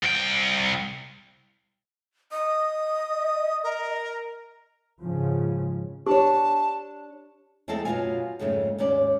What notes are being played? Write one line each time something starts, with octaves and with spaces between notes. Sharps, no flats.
C2 G5
D#5 D#6
A#4
G#2 C#3 F3 C#4
D4 G4 C#5 A5
E2 G#3 A3 C4 A4 A5
F#2 B2 E3 F4 F5 G#5
F2 G#2 C#3 A3
D#2 G#2 C#4 D5